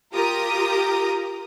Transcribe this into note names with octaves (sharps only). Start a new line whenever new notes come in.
F4 G4 A#4 A#5 D#6